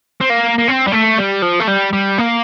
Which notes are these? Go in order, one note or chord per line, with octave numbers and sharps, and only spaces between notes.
C4
A#3
A#3
C4
G3
A3
G3
F3
A3
G3
G3
A#3